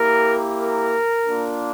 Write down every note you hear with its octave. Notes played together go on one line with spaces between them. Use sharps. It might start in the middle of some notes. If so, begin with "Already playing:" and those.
Already playing: A#3 E4 G4 A#4
A#4
A#3 D4 F4